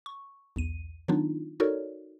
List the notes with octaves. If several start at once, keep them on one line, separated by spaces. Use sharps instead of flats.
C#6
B1 E2 D#7
D#3 F#3 B3 D4 D#4 F4
D#4 F#4 A4 A#4 C#5 D5